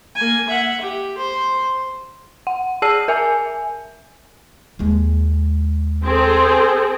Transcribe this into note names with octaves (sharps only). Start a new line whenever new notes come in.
A#3 G#5
E5 F#5
G4
C5
F#5
G#4 A5 E6 C7 D#7
A#4 E5 G#5
D#2 G#3
C4 G#4 A4